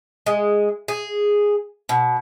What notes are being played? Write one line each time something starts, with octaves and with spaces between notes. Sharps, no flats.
G#3
G#4
B2